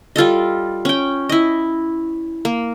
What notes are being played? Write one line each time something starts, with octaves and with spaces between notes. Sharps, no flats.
G3 F4 A4 D#5
C#4 G5
E4 D#5
A#3